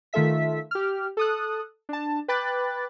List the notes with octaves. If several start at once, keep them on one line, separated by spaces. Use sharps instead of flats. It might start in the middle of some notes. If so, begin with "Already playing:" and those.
D#3 A3 F4 A4 E5 B6
G4 F6
A4 D#6 F#6
D4 A5
B4 G5 B5 D6 F#6 A6